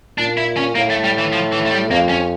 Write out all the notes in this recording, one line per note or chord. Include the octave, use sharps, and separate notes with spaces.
A#2 D4
E4
C#4
A2 A#3
A3
G3
E3
F3
E3
A3
G3
F2 A#3
C#4